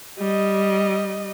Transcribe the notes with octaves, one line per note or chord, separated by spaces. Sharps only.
G3 D#5